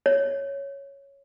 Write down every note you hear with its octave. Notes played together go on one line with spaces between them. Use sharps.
C#5